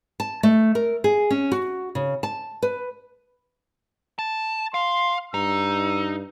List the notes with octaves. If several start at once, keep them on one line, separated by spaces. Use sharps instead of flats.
A5
A3
A#4
G#4
C#4
F#4
C#3
A5
B4
A5
F5 C6
G2 D#4 E6